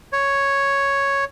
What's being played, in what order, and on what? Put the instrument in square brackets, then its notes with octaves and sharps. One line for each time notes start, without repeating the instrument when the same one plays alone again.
[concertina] C#5